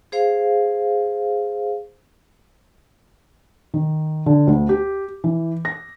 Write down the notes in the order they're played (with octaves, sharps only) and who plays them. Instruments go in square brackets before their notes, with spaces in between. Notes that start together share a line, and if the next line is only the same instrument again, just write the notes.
[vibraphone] G#4 C5 F5
[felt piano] D#3
D3
D2
G4
E3
A#6